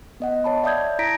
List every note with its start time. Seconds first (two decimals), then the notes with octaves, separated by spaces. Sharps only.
0.20 B3 D#5 F#5
0.44 C#5 A5 B5
0.64 D5 E5 A5 D#6 G6 G#6
0.99 E4 A#5 A#6 B6 D7